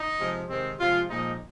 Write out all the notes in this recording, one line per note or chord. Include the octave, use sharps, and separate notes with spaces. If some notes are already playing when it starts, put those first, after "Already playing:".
Already playing: D#4
C3 F3 G#3
C3 D#3 G#3 C4
C3 F3 G#3 F4
A#2 F3 G#3 D#4